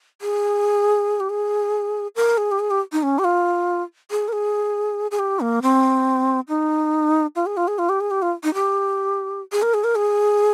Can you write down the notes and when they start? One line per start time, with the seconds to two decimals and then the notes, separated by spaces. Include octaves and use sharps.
0.22 G#4
1.20 G4
1.30 G#4
2.16 A#4
2.38 G#4
2.52 G4
2.59 G#4
2.71 G4
2.92 D#4
3.03 C#4
3.19 G4
3.24 F4
4.11 G#4
4.28 A#4
4.33 G#4
5.11 G#4
5.19 G4
5.40 A#3
5.62 C4
6.49 D#4
7.36 F4
7.46 G#4
7.57 F4
7.68 G#4
7.79 F4
7.89 G4
8.01 G#4
8.11 G4
8.22 F4
8.44 D#4
8.54 G4
9.52 G#4
9.62 A#4
9.74 G#4
9.84 A#4
9.95 G#4